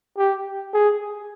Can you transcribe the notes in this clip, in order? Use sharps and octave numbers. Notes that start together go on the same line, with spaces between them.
G4
G#4